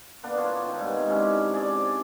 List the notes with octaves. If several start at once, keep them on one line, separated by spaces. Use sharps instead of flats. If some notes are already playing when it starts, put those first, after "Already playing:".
A#3 B3 D4
F4 C#5 A5
D#3 D#4
G#2 C3 B3
C3 C#4 D4 E4
G#4 D5